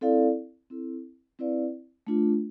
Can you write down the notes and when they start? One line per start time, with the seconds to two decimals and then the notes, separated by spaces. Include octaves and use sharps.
0.01 C4 E4 A4 D5 F5
0.70 C4 E4 A4
1.39 C4 E4 B4 D5 F5
2.07 A3 D4 F4